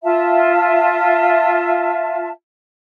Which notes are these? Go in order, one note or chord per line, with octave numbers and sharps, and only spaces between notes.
F4 E5 A5